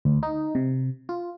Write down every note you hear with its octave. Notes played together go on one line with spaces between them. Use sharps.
D2
D#4
C3
F4